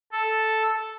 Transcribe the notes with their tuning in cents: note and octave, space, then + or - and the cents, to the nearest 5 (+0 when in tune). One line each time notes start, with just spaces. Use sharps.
A4 -5